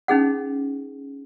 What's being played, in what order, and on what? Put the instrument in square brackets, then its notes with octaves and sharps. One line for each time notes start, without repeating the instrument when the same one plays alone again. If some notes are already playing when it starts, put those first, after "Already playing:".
[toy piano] C#4 D#4 G#4 F#5